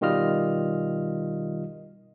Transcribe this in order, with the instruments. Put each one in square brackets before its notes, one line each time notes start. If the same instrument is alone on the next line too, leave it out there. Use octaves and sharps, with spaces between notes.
[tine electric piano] B2 D#3 G3 F4 D#5 F6